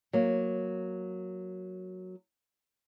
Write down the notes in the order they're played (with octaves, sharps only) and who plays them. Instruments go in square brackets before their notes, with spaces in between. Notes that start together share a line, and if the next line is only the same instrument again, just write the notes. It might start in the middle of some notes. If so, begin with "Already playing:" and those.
[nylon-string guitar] F#3 A#3